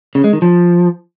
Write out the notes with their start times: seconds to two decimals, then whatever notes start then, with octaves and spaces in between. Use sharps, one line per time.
0.15 C#3
0.24 G#3
0.33 D#3
0.42 F3